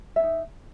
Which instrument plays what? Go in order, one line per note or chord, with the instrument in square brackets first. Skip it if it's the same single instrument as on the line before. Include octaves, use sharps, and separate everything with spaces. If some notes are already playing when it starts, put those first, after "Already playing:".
[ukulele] E5
C#4
D#4